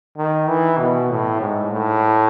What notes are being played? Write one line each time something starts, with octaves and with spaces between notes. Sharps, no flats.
D#3
E3
B2
A2
G#2
A2